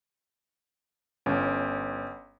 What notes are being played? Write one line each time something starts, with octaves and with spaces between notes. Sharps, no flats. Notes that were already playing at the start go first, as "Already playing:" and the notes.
G1 C#4